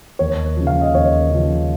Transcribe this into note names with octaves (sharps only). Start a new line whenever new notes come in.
D#2 C#5
C#3 F3
F5
D#5
D#2 C#5
C#3 F3